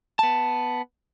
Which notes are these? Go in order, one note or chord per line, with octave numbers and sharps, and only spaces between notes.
B3 A5